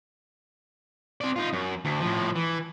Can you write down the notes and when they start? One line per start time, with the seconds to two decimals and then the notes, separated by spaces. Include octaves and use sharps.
1.21 C4 D5
1.36 D#4 F4
1.53 F#2
1.85 D2
2.01 A2 F3
2.35 E3